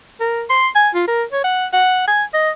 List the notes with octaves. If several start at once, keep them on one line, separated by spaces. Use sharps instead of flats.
A#4
C6
G#5
F4
A#4
C#5
F#5
F#5
G#5
D#5